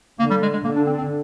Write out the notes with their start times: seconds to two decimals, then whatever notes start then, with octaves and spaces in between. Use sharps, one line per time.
0.19 D3 A#3
0.30 G3
0.42 G#3
0.53 G#3
0.64 D3 A#3
0.76 D4
0.86 C4
0.98 C4